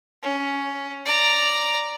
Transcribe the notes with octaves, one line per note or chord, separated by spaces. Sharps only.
C#4
D5 A#5